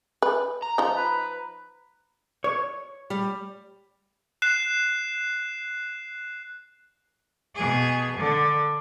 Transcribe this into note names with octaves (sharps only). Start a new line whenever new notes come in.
B4
A#5
F3 D#4
B4
C#5
G3
F#6 C7 E7
B2 G#4
D3